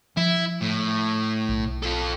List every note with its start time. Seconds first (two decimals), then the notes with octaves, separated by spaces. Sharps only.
0.17 F3 E4
0.61 A2
1.49 B1
1.83 F4 A4